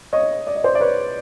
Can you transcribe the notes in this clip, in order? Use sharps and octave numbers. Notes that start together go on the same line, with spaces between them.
C#5 D#5
D5
D#5
C5 D5
D5
B4 C#5